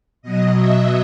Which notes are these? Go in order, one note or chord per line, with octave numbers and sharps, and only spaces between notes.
B2 F#3 D#5
E5